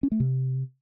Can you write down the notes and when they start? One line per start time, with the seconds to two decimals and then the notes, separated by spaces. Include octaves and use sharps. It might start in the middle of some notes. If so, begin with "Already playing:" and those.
0.03 C#4
0.12 A3
0.20 C3